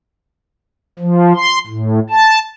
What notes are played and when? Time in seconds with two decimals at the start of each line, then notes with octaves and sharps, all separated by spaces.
0.99 F3
1.36 C6
1.67 A2
2.10 A5